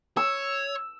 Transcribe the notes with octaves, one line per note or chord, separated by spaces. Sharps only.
C#5 E6